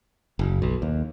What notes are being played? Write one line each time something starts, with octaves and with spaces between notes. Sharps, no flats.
F#1
B1
D#2